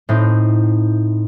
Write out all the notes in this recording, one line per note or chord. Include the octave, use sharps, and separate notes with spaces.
A2 C4 D#4